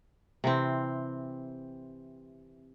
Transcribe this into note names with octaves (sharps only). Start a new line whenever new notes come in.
C3 E3 C4